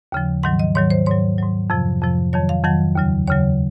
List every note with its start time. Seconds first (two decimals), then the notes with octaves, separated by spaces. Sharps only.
0.12 D#2 C#3 F3
0.43 G#2 D#3 F#3 F#5
0.59 D#5
0.75 G#2 D#3 F#3 C#5
0.90 C5
1.06 G#2 F#3 C#5
1.38 G#2 F#3
1.70 F2 C3 F3
2.01 F2 C3 F3
2.33 F2 D#3 F#3 C#5
2.49 F5
2.64 F2 D#3 F#3 F#5
2.95 D#2 C#3 F#3
3.27 D#2 C#3 F#3 C#5